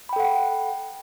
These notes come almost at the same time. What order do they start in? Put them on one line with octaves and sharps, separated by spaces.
B5 G5 A4 F#5